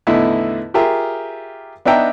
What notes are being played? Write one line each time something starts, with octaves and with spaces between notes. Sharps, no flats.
E2 A2 D3 D#4 E4 E5
F4 G4 G#4 A#4 E5
B3 D4 D#4 E5 G5 A#5